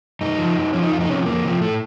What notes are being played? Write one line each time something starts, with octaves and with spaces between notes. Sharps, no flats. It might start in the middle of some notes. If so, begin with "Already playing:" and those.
F#2 D#4
F3
F#2
F3 C#4
D#4
F2 F4
D#4
C3 F3 C#4
F2 A#3
C3 F3
A2 A3